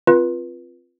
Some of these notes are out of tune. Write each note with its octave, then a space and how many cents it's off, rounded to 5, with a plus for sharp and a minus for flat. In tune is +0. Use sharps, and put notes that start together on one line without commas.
C4 +0 F4 +0 B4 -30